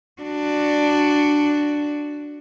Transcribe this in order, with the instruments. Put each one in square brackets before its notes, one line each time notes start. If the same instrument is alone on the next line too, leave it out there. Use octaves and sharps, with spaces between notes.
[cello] D4 F#4